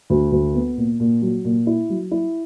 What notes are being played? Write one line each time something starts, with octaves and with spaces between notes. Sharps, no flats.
D2
D2
B3
A#2
A#2
F#3
A#2
E4
F#3
E4